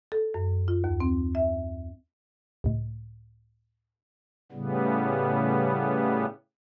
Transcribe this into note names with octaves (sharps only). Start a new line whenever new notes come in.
A4
F#2
F4
D#2
C4
E5
C#2 A2
A2 C#3 G3 B3